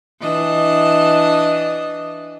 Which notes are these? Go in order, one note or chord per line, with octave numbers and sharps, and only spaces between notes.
E3 D4 D#5